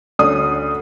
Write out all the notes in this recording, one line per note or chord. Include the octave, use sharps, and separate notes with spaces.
D2 C#4 D5 D#6